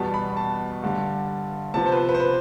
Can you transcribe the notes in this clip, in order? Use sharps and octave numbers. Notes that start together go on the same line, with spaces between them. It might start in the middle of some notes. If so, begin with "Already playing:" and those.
Already playing: E2 B2 G3 B3 A5
B5
A5
G2 D3 G3
C3 F3 B3 A5
C5
B4
C5
B4
C5
B4